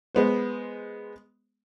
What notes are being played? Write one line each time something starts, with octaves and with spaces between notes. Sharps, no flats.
G#3 B3 C5